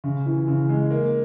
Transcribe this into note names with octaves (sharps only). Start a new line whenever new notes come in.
C#3
E3
C#3
G#3
A#3